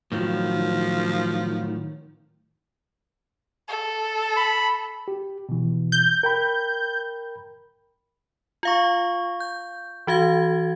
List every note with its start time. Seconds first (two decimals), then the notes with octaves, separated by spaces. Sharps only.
0.12 A2 D#3 F3 F#3
3.69 A4
4.37 B5
5.08 G4
5.49 B2 E3
5.92 G6
6.23 A#4 G5 B5
8.63 F4 F5 C#6
9.40 G6
10.07 E3 F#4 F5 G#6